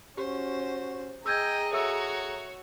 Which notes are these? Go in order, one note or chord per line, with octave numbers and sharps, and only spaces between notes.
C#4 F#4 G4 C5
G#4 D#5 G5 A#5 E6 G6 G#6
F#4 A4 C#5 E5 E6